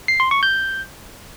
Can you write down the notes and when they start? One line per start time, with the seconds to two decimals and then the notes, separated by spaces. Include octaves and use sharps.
0.08 C7
0.20 C6
0.31 C#6
0.43 G6